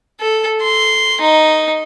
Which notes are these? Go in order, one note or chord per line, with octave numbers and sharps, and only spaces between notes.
A4
C6
D#4